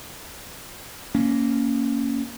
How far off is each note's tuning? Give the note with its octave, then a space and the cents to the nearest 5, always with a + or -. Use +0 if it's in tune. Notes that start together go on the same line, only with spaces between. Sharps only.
A#3 -10 C#4 +5